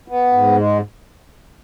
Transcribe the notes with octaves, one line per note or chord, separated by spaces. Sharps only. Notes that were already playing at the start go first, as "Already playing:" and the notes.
B3
G#2
G#3